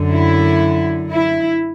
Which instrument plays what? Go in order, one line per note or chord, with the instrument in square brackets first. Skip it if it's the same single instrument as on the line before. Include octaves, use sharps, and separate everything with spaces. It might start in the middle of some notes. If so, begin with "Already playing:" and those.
Already playing: [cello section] F#2 D3
E4
E4